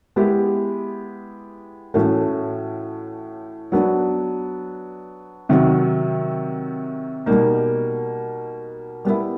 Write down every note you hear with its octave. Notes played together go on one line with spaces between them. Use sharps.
G#3 B3 E4 G4
A2 E3 A3 C#4 F#4
F#3 B3 D4
C3 D#3 F#3
B2 G3 A#3 D#4
G3 B3 E4